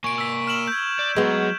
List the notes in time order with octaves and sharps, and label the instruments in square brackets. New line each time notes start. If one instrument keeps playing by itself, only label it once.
[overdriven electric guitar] A#3 G#5 [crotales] C#6 D7
[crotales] E6 B6
F6 E7 F#7
G6 G#6
[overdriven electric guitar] D5
[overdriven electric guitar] F#3 [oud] G#3 B3